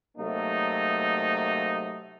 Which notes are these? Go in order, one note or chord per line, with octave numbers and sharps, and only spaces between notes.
C3 F#3 A3 A#3 D#4